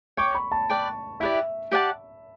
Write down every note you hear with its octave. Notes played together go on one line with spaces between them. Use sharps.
C#5 G5 C#6 D6
B5
A5
B4 D5 G5
E4 G4 B4 D5 E5
G4 D5 F#5 A5